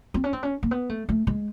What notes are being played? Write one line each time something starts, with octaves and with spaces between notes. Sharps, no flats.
C4
C#4
C4
C#4
A#3
B3
A3
A3
G#3